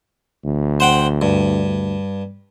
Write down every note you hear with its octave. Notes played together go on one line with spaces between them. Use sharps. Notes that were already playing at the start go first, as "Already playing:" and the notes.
D2
C5 F#5 G5
G2